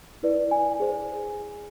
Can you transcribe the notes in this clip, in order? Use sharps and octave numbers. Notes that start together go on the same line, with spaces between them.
E4 B4 D5
G#5
G#4 C5